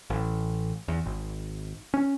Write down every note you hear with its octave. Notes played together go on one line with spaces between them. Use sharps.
A1
E2
G#1
C#4